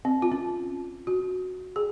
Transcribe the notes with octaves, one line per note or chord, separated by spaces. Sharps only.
C4
F4
C#4
F#4
G#4